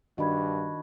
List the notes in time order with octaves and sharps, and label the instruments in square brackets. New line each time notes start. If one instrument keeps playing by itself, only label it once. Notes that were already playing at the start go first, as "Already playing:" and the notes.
[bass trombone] G2 [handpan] D#3 D4 F#4 [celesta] D#5 B5 G#6